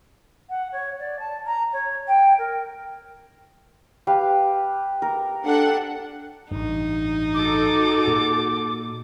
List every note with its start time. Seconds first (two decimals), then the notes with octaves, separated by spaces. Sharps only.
0.49 F#5
0.72 C#5
0.99 D5
1.19 A5
1.46 A#5
1.72 C#5
2.07 G5
2.38 A#4
4.07 G4 B4 F5
5.02 A#4
5.44 D4 A4 F#5
6.51 A1 G2 D#4
7.34 F#4 A4 D6
8.08 A#2